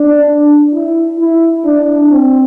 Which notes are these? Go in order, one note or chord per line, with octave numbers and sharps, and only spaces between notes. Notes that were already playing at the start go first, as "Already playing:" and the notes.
Already playing: D4
E4
E4
D4
C4